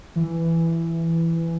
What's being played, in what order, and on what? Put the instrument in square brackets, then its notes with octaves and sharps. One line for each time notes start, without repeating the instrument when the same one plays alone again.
[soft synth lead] E3